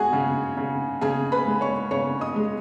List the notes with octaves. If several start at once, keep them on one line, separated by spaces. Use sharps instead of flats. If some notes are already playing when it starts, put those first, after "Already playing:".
Already playing: G#3 F#4 G#4 F#5 G#5
C#3
C#3
C#3 G#4 G#5
B4 B5
G#3
C#5 C#6
C#3 C#5 C#6
D#5 D#6
G#3